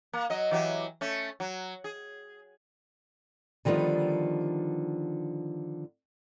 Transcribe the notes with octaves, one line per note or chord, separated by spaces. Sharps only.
A#3
F#3 D#5
E3 F#3 G4
A3 C#4
F#3
G#4
D3 D#3 F3 G3 B3